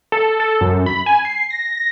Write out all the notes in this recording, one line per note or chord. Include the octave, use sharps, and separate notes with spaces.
A4
A4
F#2
B5
G#5
C7
A#6
A#6